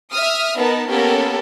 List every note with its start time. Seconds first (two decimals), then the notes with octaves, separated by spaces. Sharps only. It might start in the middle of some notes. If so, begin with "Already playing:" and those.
0.12 E5 D#6 F6
0.58 B3 D#4 A#4 A5
0.90 A#3 B3 C#4 G4 A4 A#4